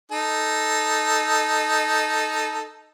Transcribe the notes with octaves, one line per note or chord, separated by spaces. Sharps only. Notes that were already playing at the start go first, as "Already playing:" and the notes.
D#4 A4